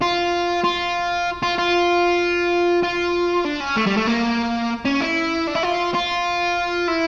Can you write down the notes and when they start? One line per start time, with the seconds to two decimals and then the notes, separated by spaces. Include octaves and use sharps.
0.02 F4
0.64 F4
1.43 F4
1.58 F4
2.83 F4
3.44 D4
3.60 C#4
3.76 A3
3.87 G3
3.97 A3
4.07 A#3
4.85 C#4
5.01 E4
5.47 D4
5.55 E4
5.63 F4
5.94 F4
6.88 E4